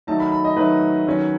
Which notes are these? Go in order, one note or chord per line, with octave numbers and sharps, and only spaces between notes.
D#3 F#3 A3 D#4 A5
B5
B5
D#5
D#3 F#3 A3 D#4 B4
D#3 F#3 C#4